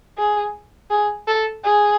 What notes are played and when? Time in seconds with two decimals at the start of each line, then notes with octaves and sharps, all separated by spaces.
0.17 G#4
0.90 G#4
1.27 A4
1.64 G#4